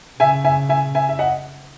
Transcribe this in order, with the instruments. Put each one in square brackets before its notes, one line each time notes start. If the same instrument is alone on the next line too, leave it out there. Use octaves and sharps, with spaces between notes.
[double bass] C#3 [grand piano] E5 G#5
[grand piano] E5 G#5
E5 G#5
E5 G#5
E5
D#5 F#5